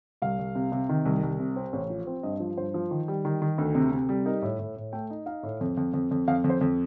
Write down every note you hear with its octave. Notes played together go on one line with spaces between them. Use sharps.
C2 F5
C2
C3
C3
D#3
C2
C2
C3
C4
A1
F3
C4
G2 D#5
F3
G2 C5
F3
D#3
G3
D#3
D#3
D2
C3
C3
G3
D#4 A#4
A2
A2
A2
A3 G5
D#4
D#4 F5
A2
F2
F2
F2
F2
F2 F5
F2
C5
F2